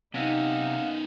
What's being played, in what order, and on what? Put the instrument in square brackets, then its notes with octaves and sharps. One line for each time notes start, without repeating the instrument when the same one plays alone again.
[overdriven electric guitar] C3 [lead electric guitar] B3 C#4 [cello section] D#4 [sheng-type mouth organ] F5 F#5